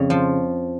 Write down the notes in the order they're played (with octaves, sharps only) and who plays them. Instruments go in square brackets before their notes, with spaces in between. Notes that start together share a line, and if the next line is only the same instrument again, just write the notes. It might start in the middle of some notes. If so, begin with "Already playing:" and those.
Already playing: [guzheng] F2 C#3
F3